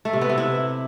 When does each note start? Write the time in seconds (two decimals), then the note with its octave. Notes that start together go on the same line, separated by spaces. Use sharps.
0.05 A3
0.13 C3
0.21 B3
0.29 C3
0.38 E4